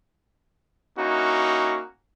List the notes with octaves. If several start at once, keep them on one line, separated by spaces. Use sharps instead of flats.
A#3 C#4 D#4 E4 F#4